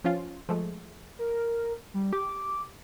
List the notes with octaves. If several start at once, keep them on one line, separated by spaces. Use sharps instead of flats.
F3 C#4 F4
F3 G#3 A3
A#4
G3
G4 D6